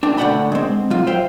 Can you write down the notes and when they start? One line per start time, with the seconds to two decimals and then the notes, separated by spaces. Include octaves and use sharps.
0.03 D4 G5
0.17 A2 D3 D5 F#5 G5 B5
0.52 G#3 C4
0.90 F#3 F4
1.07 C5 E5 F5 G5